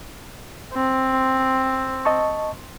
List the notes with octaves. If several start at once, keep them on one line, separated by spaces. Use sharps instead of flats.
C4
D#5 A5 C#6